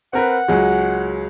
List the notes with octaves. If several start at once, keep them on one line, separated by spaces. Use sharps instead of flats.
C4 A#4 B4 F#5
C#2 F#3 G#3